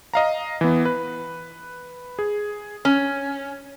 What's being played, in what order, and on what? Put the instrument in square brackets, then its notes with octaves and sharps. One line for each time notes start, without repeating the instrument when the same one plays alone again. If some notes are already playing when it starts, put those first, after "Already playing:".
[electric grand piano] D#5 F5 A#5
E3 B3
B4
G#4
[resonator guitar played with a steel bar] C#4